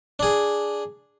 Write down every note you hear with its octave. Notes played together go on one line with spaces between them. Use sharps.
D4 G#4